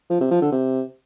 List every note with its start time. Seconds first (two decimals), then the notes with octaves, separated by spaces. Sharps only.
0.10 F3
0.20 C3
0.31 F3
0.41 D3
0.52 C3